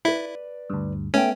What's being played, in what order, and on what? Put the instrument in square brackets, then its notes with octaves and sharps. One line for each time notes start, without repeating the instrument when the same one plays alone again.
[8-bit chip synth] E4 [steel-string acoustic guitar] B4 D5
[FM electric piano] D2 G2
[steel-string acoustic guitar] A3 G5 [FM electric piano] B3 [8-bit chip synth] C#4